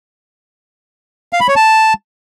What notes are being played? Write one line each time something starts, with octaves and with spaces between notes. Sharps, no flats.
F5
B5
C#5
A5